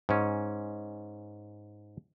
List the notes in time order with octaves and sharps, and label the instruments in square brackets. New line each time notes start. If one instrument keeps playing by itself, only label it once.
[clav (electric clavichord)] G#2 C#4